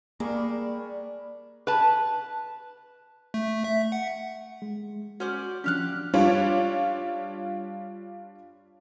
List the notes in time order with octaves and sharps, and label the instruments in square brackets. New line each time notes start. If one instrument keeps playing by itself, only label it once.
[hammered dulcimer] G3 B5 C#6 [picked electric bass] A#3 [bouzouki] D4 [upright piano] G#4 A#4
[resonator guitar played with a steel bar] B4 A5
[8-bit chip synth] A3
E5
F#5
[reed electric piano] G#3
[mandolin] C#4 C5 D5 [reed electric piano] F#4
[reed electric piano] F3 C#4 D4 [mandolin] G4 F5 F#6
[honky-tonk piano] G3 D4 F4 C#5